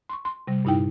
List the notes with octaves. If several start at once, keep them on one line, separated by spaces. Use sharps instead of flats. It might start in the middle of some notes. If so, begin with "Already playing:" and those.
C6 C#6
C6
C3 G3
G2 A#2 D#4 E4 G5